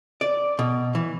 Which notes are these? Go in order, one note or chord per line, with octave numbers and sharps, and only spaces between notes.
D5
B2
E3